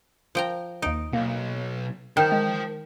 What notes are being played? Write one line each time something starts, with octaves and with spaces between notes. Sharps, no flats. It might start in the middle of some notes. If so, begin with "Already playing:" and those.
F3 G5 A#5
D#2 D#4 D7
B1 A#3
D#3 C5 G5 A5 F6 G6
G#3